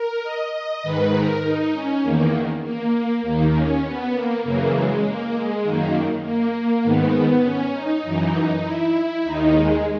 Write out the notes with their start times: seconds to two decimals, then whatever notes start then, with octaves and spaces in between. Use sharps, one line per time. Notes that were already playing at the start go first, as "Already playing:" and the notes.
Already playing: A#4
0.23 D#5
0.53 D#5
0.83 G#2 D#3 B4
1.13 A#4
1.43 D#4
1.73 C#4
2.03 E2 D#3 A#3
2.64 A#3
3.23 D#2 D#3 A#3
3.53 C#4
3.84 B3
4.14 A#3
4.43 F#2 C#3 E3 A#3
4.73 G#3
5.04 A#3
5.34 G#3
5.64 F#2 D#3 A#3
6.23 A#3
6.84 G#2 D#3 B3
7.44 C#4
7.74 D#4
8.03 F#2 E3
8.64 E4
9.24 D#2 D#3 D#4
9.53 G#3